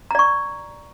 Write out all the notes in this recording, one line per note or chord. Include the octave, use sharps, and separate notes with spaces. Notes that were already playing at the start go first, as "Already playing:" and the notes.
D5 A#5 C#6